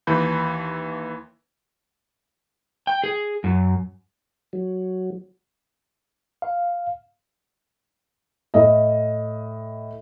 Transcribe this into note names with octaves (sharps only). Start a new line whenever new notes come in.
D#2 E3 B5 G6
G5
G#4
F#2
F#3
F5
A2 D#5